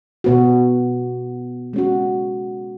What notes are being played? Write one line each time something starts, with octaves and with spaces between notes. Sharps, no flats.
B2 B3 F#4
G#3 C#4 F#4